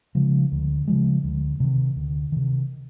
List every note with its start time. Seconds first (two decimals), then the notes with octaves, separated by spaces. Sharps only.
0.15 C#3 F3 G#3
0.52 D2
0.88 C#3 F3 G#3
1.24 D2
1.60 C3 D#3
1.96 D2
2.32 C3 D#3